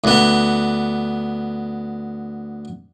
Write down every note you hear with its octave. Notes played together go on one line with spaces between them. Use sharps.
D2 B3